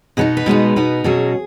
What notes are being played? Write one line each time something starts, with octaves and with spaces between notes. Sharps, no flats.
B2 B3 D#4 G#4
B4
B2 G#3 B3 D#4
B2 B3 D#4
B2 F#3 C#4 G#4